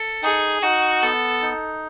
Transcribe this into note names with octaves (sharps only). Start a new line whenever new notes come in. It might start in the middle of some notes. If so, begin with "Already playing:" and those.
Already playing: A4
D#4 G#4
D#4 F#4
B3 A4
D#4